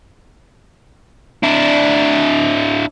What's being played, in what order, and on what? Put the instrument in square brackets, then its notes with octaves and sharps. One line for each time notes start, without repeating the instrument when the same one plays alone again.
[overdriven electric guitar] D4 E4